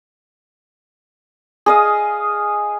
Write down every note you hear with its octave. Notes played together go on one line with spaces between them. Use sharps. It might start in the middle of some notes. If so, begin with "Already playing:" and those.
G#4 D#5 F5